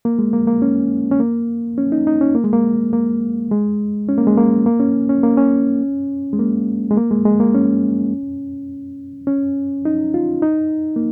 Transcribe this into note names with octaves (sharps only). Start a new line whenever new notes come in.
A#3
G#3
A#3
A#3
C#4
C#4
A#3
C#4
D#4
D#4
C#4
A#3
G#3
A#3
A#3
G#3
C#4
A#3
G#3
A#3
A#3
C#4
C#4
A#3
C#4
G#3
A#3
G#3
A#3
G#3
G#3
A#3
C#4
C#4
D#4
F4
D#4
A#3